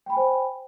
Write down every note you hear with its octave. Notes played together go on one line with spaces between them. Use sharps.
C5 G5 G#5 B5